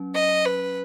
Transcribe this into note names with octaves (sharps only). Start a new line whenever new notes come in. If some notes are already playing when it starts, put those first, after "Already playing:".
Already playing: F#3 C#4
D#5
B4